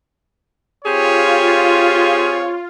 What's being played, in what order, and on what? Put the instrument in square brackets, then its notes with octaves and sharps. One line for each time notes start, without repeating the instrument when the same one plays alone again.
[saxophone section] C4 G4 G#4 [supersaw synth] F4 [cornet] C#5